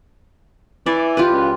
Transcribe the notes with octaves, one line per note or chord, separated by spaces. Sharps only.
E3 D5 E5
F4 G4 B4
C#2